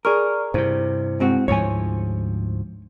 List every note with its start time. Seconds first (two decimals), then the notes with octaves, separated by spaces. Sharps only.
0.05 G#4 A#4 D5 C#6 F6
0.54 G2 C3 E4 C5
1.20 G#2 C4 F#4
1.48 D2 G#2 F3 C#5 G#5